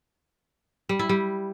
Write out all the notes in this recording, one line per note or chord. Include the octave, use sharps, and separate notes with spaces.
G3
E4
G3